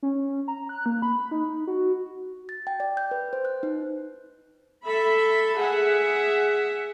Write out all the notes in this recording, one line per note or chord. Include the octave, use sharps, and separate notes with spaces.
C#4
A#5
F#6
A#3
B5
D#4
F#4
A6
G5
D5
G6
B4
C5
F#6
D#4
A4 E5 B5
G#4 E5 F#5